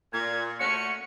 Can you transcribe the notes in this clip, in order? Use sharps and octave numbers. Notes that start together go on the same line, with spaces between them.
A#2 G#6
A3 C#4 F#4 C#7